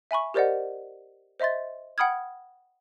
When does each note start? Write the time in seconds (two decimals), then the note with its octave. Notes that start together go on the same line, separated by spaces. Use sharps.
0.11 E5 G#5 B5 C#6
0.34 G4 A#4 C5 D5 D#5 F#5
1.40 C5 D#5 E5 C6 A6
1.98 F#5 G5 B5 D#6 F6 G#6